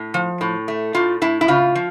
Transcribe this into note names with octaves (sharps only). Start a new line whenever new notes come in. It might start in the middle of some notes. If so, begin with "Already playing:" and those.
Already playing: A2
F3
A2
A3
A2 F4
A2 E4
E4
C#3 F4
F3